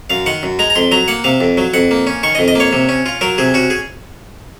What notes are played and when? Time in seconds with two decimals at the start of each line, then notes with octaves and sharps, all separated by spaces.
0.10 F#2 F5
0.26 D#3 F#5
0.43 F#2
0.59 G#3 A#5
0.70 A#5
0.75 F2 C6
0.91 F#3 A#5
1.08 A#3 F#5
1.24 C3 F5
1.41 F2
1.57 F#3
1.74 F2 F#5
1.91 A#3
2.07 C#4
2.23 D#3 C#6
2.35 D#5
2.39 F2
2.48 D#5
2.55 A#3 C#5
2.73 C3
2.89 C#4
3.06 F4
3.21 F#3 A#4
3.38 C3 G#4
3.54 C#4 F#4
3.70 G#4